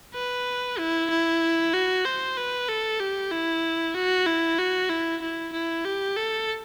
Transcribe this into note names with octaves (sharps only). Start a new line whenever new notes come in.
B4
E4
E4
F#4
C5
B4
A4
G4
E4
F#4
E4
F#4
E4
E4
E4
G4
A4